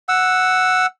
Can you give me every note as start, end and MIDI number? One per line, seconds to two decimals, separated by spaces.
0.09 0.86 78
0.09 0.86 88